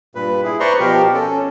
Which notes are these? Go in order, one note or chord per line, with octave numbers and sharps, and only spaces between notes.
G2 A#2 B4
E4 G#4
B4 C5 D5 A#5 C6 C#6
B2 F3 G4 A#4
C#4 A4